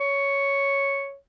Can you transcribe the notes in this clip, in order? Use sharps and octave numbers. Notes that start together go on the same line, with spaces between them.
C#5